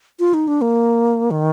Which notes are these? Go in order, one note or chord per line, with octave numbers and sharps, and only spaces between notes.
F4
D#4
D4
A#3
D#3